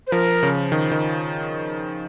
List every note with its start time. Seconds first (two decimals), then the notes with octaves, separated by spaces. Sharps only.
0.07 C5
0.12 F3 A#4
0.43 C#3
0.72 D#3
0.91 D#3